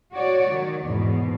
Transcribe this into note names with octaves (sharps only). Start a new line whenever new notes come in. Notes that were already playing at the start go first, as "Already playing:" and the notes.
F#4 C#5 D5
D#3
E2 G#2 B2